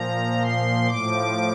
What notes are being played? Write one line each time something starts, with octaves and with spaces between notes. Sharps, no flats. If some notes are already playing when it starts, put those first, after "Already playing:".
Already playing: A#2 F3 A#5
C6
A2 F3 D6